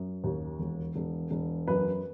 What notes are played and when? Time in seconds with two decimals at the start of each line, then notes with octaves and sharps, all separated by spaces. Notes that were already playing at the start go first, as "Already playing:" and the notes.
Already playing: F#2
0.24 D#2
0.59 E1
0.95 E1
1.31 E1
1.67 F#2 B4